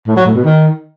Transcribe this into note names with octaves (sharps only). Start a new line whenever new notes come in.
A2
F#3
A2
B2
D#3